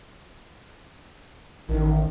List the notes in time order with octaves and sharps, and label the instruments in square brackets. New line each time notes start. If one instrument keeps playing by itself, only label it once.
[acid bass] A1 [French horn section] D#3